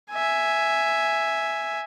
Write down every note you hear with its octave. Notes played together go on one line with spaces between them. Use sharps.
E5 G#5